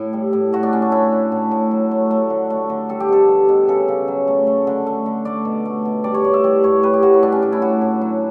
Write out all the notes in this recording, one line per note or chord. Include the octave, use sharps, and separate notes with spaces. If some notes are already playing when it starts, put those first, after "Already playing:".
Already playing: A2 E4
G3
A2
A3 F#4
D4
D3 C#4
D4
A3 E4
D3
A2
A2
F#3
A3
A3
D3
A3
D3
G3 A4
G4
B2 A4
G3
B2
C#3 A4
C#3
F#3
A3
A3
D3
A3
D3
A3 D5
B2
A3
B2
G3 D5
C#5
A2 D5
E5
G3 D5
A2 C#5
G3 B4
G4
A2 F#4
E4
G3 D4
C#4
A2 D4
E4
A2 F#4
A2
F#3